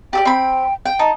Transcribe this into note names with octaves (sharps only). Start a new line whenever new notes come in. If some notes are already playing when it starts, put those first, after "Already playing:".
G4 A4 D5 G5
C4 B5
G5
D#4 A5